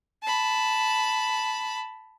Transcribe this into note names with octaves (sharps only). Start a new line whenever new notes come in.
A5 B5